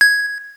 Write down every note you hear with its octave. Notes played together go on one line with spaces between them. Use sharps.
G#6